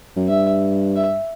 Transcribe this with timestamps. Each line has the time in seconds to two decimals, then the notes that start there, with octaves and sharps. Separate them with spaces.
0.16 F#2
0.28 G2 E5
0.96 E5